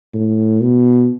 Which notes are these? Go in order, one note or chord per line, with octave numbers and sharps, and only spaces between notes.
A2
B2